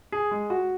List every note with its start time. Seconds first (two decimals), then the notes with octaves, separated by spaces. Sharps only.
0.12 G#4
0.31 G#3
0.50 F#4